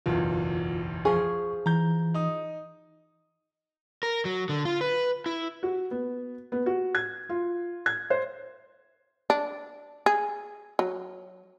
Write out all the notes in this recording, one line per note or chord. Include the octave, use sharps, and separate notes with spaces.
F#1 B1 E2 F4
F3 G#4 C#6
E3 A#5 G6
D#4 D#6
A#4
F#3
D3
F4
B4
E4
F#4
B3
B3
F#4
G#6
F4
G#6
C5
D4
G#4
F#3